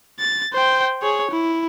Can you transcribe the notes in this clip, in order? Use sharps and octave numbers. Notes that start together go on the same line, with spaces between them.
A6
C5 G5
G#4 C#5
E4